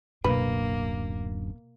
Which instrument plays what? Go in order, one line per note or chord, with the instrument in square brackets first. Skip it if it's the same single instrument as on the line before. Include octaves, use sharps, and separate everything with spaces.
[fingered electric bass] D1 F#2 D4 [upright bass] B2 [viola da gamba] A#3 [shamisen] B4